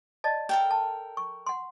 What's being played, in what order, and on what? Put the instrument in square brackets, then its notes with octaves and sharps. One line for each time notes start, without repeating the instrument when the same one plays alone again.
[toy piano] D5 D#5 A5
[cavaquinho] A4 A#4 G5
[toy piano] A5
C#6
F#5 C6